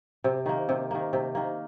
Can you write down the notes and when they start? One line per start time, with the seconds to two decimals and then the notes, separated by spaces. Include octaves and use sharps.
0.24 C3
0.46 D#3 A#3
0.69 C3
0.91 D#3 A#3
1.13 C3
1.35 D#3 A#3